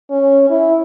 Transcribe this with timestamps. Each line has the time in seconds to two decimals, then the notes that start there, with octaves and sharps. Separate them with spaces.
0.10 C#4
0.50 E4